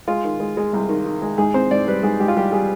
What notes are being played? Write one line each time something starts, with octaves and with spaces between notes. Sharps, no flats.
G#3 F4
D#3
G#3
G#3
C2
D#3
D#3
G#3
G#2 G#4
C4 C5
G#2 D5
G3 B4
G#2 G#4
G#2 G4
F4
G3 G4
G3 G#4